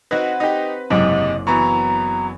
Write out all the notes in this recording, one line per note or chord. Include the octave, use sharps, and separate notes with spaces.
C4 D#4 F#4 B4 F#5 G#6
D#4 G4
F#1 G#2 C3 D#5 D6
E3 F#3 B3 A#5 C#6